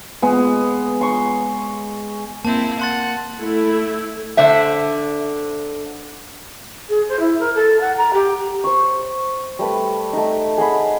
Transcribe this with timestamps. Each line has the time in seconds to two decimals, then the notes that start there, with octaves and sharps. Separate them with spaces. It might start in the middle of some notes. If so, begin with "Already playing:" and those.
0.22 G#3 B3
1.01 C6 C#6
2.45 A#3 C4 E4 A5
2.79 F#5 A5 C6 A6
3.40 A3 E4
4.37 D3 D4 C5 E5
6.89 G#4
7.08 C5
7.19 E4
7.39 A#4
7.55 A4
7.80 F#5
7.97 A#5
8.13 G4
8.64 C5 C6 C#6
9.59 G3 A3 B4
10.13 A3 D#4
10.57 G#4 D#5 F#5 B5